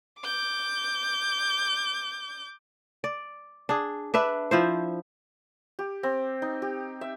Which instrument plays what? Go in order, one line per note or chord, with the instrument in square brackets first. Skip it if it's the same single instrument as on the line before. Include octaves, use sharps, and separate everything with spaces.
[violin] D6 G6
[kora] D5
D4 G#4
D4 B4 E5
F3 E4 C5
[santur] G4
C4
D#4
G4
E5